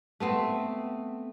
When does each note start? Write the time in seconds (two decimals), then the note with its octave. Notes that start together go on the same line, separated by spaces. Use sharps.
0.20 A3 B3 C4